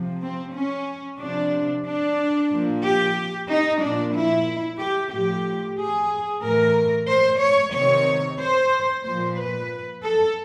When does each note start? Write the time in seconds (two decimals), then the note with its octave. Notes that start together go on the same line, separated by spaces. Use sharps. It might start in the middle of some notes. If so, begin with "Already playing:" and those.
Already playing: C3 F3
0.21 C4
0.54 C#4
1.19 C3 F3 D4
1.85 D4
2.51 A#2 F3
2.83 G4
3.48 D#4
3.81 A#2 F3 D4
4.14 E4
4.79 G4
5.12 A2 F3 G4
5.78 G#4
6.43 A2 E3 A#4
7.08 C5
7.41 C#5
7.74 C3 D#3 C#5
8.39 C5
9.05 A#2 F3 C5
9.37 B4
10.03 A4